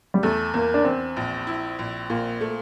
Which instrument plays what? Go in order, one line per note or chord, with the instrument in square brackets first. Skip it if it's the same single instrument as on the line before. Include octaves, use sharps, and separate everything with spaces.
[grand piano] G3
[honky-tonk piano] E2 [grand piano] A3
[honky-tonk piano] E2 [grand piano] A#3
[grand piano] D4
[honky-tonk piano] E2 [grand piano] C4
[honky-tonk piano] A#1
E4
A#1
A#2
A3